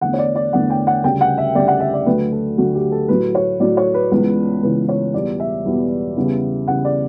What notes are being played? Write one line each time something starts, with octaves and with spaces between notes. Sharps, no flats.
E2 D3 A3 F#5
C#5
D5
D5
E2 D3 A3 F#5
G5
F#5
D2 C#3 G3 G5
F#5
E5
D2 C#3 G3 D5
F#5
E5
D5
D2 D3 F#3 A3 B4
A4
D2 D3 F#3 A3 F#4
G4
A4
A2 F#3 A3 B4
C#5
A2 F#3 A3 D5
C#5
B4
C#2 C#3 E3 B3
C#2 C#3 E3 B3 B4
C#5
E2 B2 G3 B3 D5
E5
E2 B2 G3 B3
E2 C#3 G3 B3
E2 C#3 G3 B3 F#5
D5